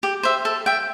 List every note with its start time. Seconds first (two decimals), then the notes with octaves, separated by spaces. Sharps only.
0.03 G4
0.23 C5 E5
0.45 A4
0.66 E5 G5